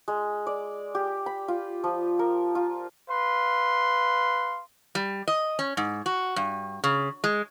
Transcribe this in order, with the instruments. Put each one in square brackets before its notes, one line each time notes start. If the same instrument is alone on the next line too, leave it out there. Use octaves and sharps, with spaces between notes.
[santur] G#3
D5
G4
B5
F4
F3
A#4
F4
[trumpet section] B4 F5 C6
[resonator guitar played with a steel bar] G3
D#5
C#4
G#2
F#4
G2
C#3
G#3